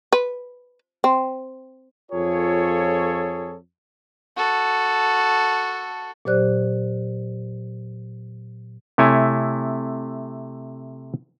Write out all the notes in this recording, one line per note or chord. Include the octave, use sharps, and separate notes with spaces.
B4
C4
F2 F4 G#4 A4 C#5
F#4 A4
A#2 F#3 G4 C5 D5 F#6
C3 A3 E4 C#5 G#5